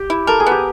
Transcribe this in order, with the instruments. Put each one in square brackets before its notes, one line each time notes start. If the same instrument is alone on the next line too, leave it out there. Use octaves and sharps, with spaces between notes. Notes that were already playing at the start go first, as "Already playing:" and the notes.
Already playing: [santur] G4
[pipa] E4
[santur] A4 [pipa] A#4
[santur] G#4
[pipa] B3 [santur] G4